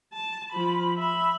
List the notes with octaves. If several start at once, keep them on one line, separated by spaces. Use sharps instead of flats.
A5
F3 B5
E5 B5